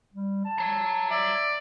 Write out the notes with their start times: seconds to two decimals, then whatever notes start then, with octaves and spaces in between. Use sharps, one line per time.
0.14 G3
0.45 A5
0.58 C#5 A#5
1.11 D5 E5